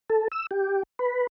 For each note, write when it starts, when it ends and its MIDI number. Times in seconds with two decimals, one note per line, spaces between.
0.10 0.28 69
0.32 0.46 88
0.51 0.83 67
0.99 1.27 71